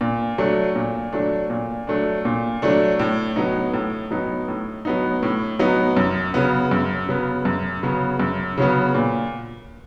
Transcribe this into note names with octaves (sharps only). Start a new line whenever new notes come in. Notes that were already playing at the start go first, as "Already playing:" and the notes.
A#2
F#3 A3 D4
A#2
F#3 A3 D4
A#2
F#3 A3 D4
A#2
F#3 A3 D4
A2
F#3 B3 D#4
A2
F#3 B3 D#4
A2
F#3 B3 D#4
A2
F#3 B3 D#4
F#2
C#3 F#3 B3
F#2
C#3 F#3 B3
F#2
C#3 F#3 B3
F#2
C#3 F#3 B3
A#2